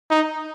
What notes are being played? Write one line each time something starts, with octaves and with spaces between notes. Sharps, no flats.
D#4